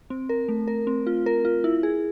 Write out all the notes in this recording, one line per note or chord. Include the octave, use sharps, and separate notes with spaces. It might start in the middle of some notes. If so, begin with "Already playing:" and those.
C4
A#4
A3
A#4
C4
F4
A#4
F4
E4
G#4